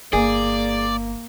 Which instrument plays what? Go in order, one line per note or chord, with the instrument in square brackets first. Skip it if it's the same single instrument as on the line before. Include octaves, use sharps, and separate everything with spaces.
[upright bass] G1 [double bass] A#3 [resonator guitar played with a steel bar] G#4 [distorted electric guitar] D5